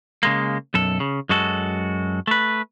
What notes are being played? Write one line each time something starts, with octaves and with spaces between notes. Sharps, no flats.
C#3 G#3 A#3
B1 F#2 A4
C#3
F#2 G#3 F#4 A4
A3 B4